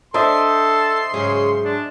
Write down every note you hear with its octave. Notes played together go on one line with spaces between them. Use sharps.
D4 A4 C5 D#5 E5 C6
G#2 C#3 F#3 G#4
D4